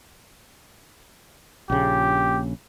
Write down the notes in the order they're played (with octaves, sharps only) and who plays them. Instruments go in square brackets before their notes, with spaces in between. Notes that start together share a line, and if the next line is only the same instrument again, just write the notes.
[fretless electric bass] A#1 C#3 [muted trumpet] G4